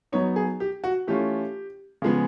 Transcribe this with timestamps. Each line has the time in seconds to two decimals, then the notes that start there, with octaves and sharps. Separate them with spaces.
0.12 F#3 B3 D#4 C#5
0.36 G#4
0.60 G4
0.84 F#4
1.07 E3 A3 C#4 F4 G4
2.02 C#3 F3 G#3 B3